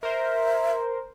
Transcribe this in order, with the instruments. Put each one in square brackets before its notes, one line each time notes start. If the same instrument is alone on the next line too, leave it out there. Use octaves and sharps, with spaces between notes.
[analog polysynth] A#4 C5 [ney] E5